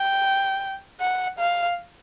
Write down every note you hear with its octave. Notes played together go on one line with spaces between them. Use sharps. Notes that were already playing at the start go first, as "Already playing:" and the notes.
Already playing: G5
F#5
F5